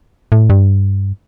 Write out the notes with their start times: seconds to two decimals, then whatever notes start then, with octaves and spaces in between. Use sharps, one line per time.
0.32 A2
0.50 G2